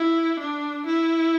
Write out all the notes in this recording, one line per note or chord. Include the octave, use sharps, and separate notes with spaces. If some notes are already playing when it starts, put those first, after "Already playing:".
Already playing: E4
D4
E4